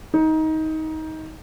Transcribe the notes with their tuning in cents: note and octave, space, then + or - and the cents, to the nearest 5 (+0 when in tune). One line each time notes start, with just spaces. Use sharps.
D#4 +20